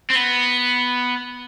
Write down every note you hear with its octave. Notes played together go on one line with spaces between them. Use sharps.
C4
B3